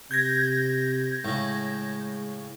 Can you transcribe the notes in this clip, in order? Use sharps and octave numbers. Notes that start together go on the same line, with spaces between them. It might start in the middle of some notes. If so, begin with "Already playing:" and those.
C3 G6 G#6 A#6
A2 C#3 G#3